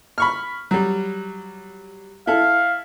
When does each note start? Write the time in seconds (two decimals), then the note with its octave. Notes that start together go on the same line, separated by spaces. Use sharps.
0.18 B5 C#6 F6
0.71 F#3 G3
2.27 E4 A4 F5